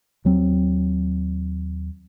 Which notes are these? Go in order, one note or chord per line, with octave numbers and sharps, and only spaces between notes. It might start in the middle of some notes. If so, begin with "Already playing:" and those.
D#2 F#3 C4